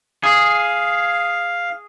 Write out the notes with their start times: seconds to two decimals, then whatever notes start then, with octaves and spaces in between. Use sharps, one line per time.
0.24 G#4 F5